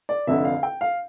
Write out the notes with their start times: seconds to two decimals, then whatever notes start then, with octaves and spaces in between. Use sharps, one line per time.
0.09 D5
0.27 F1 F2 D3 E5
0.45 F5
0.63 G5
0.81 F5